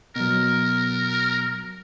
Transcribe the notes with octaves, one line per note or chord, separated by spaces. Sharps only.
B2 F#3 A#4